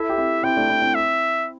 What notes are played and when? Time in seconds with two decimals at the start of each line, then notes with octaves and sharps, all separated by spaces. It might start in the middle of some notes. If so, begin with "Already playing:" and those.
Already playing: E4 A4 E5
0.10 G4
0.18 C4 E4
0.43 C4 E4 G5
0.56 A3 D4
0.69 C4 E4
0.82 C4 E4
0.95 E5